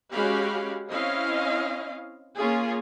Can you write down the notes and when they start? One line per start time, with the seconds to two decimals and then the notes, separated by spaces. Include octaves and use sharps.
0.12 G#3 C#4 F#4 G4 F5 B5
0.91 C4 C#4 E4 D#5 F5
2.37 A#3 C#4 F4 G#4